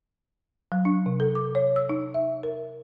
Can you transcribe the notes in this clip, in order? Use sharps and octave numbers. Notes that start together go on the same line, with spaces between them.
F#3
D4
C3
A4
D6
C#5
E6
D#4
E5
A#4